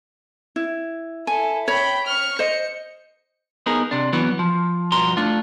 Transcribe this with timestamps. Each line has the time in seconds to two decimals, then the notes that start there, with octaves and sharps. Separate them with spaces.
0.56 E4
1.27 E4 A4 G#5
1.68 C#5 G5 B5
2.07 C#6 F6
2.39 C5 D#5 C#7
3.66 B3 D#4 G#4 A#4
3.91 C3 D4
4.13 E3 F#3 B3
4.39 F3
4.92 B1 G2 F3 F#4 A#5 C6
5.17 A3 D4 F4